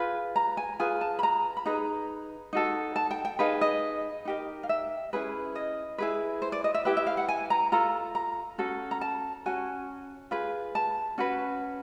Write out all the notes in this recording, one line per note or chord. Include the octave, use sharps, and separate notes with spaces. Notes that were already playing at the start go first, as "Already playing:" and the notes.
Already playing: F4 G#4 B4
A#5
G#5
F4 G#4 B4 G#5
A5
B5
A#5
B5
D#4 G#4 B4 A#5
D#4 F#4 A4
A5
G5
G5
D#4 G#4 B4 F5
D#5
D#4 G4 A#4
F5
E5
C#4 E4 G#4 B4
D#5
E4 G#4 B4
C5
D5
D#5
E5
E4 G4 B4 E5
E5
F5
F#5
G#5
A#5
F4 A4 A#5
A#5
C#4 F#4 A4
A#5
A5
C#4 F#4 G#5
F4 G#4 B4
A5
C#4 F#4 B4